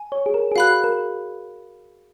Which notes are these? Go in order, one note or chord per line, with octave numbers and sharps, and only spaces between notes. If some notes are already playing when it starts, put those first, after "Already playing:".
Already playing: G#5
C#5
G#4
A#4
G#4
F#4 F5 B5 F#6
A#4